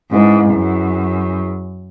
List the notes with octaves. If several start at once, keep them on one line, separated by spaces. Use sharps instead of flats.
G#2 C#4 E4 G#4 B4
F#2